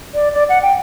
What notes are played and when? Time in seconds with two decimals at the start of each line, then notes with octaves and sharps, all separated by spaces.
0.14 D5
0.34 D5
0.49 F#5
0.62 G5